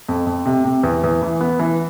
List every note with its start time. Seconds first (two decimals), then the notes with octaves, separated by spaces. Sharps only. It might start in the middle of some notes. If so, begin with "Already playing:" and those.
0.09 F2
0.27 F2
0.46 C3
0.65 C3
0.83 E2
1.04 E2
1.22 E3
1.41 B3
1.59 E3